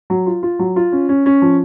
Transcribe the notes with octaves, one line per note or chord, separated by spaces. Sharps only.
F#3
F4
F4
F#3
F4
C#4
C#4
C#4
F3